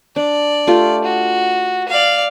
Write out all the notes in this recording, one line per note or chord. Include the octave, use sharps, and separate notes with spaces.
D4 D5
A3 F4 G4
F#4
D5 F5